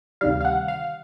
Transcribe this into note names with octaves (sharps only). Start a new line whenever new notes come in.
D2 C3 D#3 G3 F5
F5
F#5
F5